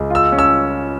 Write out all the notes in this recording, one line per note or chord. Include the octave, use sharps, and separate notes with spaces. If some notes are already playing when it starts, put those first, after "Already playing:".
Already playing: C#2
F4 E6
C#4
E6